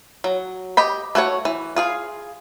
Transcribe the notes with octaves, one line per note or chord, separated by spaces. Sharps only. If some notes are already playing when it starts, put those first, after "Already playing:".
F#3
G4 D#5 B5
A3 F#4 C5 C#5
E3
F4 G#4 F5